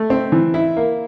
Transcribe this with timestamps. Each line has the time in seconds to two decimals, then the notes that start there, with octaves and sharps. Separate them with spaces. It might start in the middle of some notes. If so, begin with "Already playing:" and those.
Already playing: A3
0.10 C4
0.32 E3
0.54 E4
0.77 A#3